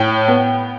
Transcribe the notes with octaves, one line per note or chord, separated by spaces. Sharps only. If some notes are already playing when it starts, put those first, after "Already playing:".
Already playing: A2 G5
B3